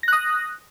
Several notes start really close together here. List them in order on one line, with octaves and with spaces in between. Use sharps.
A#6 F#6 D#6